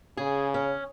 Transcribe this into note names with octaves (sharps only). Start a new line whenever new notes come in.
C#3 G#4
C#4